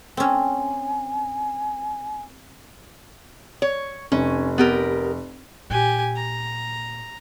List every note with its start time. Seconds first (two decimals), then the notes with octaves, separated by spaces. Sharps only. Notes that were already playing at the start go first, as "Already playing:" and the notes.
0.17 C4 C#4 G#5
3.62 C#5
4.12 F1 C#4
4.58 B3 G4 A#4
5.70 A#2 G4 G#5
6.16 A#5